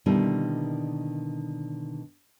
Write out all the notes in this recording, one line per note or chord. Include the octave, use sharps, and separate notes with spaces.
B2 D3 D#3 G3 A#3 E4